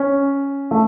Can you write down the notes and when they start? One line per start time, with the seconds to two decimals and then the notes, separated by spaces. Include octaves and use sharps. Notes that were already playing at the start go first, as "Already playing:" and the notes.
Already playing: C#4
0.71 A3